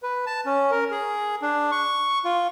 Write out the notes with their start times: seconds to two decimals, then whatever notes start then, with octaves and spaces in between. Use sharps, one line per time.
0.03 B4
0.26 A5
0.46 C#4
0.71 A#4
0.91 G#4
1.42 D4
1.72 C#6
2.25 F4